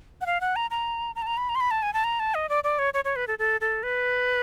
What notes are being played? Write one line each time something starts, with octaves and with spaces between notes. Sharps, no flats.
F#5
F5
F#5
A#5
A#5
A#5
A5
A#5
B5
A#5
C6
B5
A5
G#5
A5
A#5
A5
D#5
D5
D5
C#5
C#5
C#5
B4
A4
A4
A4
B4